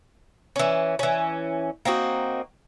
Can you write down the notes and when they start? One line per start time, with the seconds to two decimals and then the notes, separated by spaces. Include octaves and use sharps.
0.56 E3 C#4
0.99 E3 C#4
1.85 A#3 C4 D#4 F#4